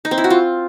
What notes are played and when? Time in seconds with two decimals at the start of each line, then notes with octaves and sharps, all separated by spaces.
0.05 D#4
0.11 C4
0.18 E4
0.24 F#4
0.30 F4